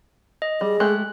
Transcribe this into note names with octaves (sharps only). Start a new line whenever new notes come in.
D#5
G3 G#4
G#3 A3 G4 F#6